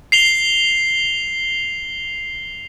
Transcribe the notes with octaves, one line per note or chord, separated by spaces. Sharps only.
C7 F7 G7